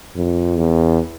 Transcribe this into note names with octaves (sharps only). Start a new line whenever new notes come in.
F2
E2